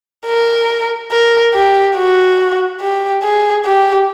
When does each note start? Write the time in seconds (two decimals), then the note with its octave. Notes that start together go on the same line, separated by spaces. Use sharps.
0.27 A#4
1.12 A#4
1.54 G4
1.97 F#4
2.81 G4
3.23 G#4
3.65 G4